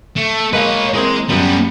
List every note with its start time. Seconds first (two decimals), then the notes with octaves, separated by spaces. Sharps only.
0.16 A3
0.53 G#3 A#3 B4 C#5 F5
0.94 E3 G#3 A#3 C4
1.29 F#2 G3 B3 F#7